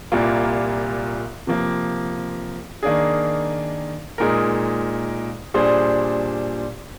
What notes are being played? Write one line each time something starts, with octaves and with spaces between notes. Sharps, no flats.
C2 A#2 G3 A#3 F4
C3 F3 A#3
D#3 A#3 D4 G#4
A#2 G#3 D#4 A#4
A#2 G3 D4 G#4 C5